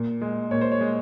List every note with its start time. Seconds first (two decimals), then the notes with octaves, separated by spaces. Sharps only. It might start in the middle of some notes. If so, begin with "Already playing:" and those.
Already playing: A#2
0.22 G#3
0.51 A#2 C#5
0.61 C5
0.72 C#5
0.81 G#3